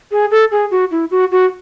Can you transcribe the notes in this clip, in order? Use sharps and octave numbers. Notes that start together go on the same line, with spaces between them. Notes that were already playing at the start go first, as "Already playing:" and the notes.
G#4
A4
G#4
F#4
E4
F#4
F#4